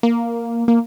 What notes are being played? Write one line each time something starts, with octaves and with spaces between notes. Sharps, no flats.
A#3
A#3